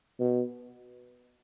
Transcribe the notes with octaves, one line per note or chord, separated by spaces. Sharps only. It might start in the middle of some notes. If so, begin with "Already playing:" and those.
B2